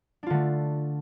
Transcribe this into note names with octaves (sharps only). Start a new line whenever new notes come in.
D3 A3 D4 F4